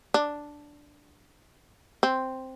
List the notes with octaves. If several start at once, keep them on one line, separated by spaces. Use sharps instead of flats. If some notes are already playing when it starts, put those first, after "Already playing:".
D4
C4